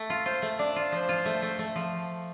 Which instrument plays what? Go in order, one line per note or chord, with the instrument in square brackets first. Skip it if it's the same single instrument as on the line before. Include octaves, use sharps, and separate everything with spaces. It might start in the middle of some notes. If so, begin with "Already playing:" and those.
Already playing: [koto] A3
F4
[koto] F4 [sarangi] C5
[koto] A3
[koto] D4 [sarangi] D5
[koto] F4
[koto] F3 [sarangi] C5
[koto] F4
A3
A3
A3
F3